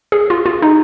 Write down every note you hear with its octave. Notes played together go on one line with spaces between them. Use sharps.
G#4
F4
F4
D#4